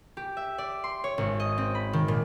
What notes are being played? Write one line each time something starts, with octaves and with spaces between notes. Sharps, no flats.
G4
E5
D5
C6
C#5
G#1
D#5
C4
B5
D#3
A#2